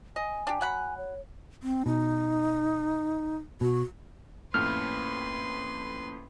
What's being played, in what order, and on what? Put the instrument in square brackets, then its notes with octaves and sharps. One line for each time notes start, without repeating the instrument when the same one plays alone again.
[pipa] D#5 [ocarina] G#5
[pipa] D4 G4
F#3 F#5 B5
[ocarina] C#5
[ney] C4
[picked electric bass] B2 [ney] D#4
[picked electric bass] B2 [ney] F#4
[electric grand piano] F2 A2 [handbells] A#3 C#4 [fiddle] B4 C6 [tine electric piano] F6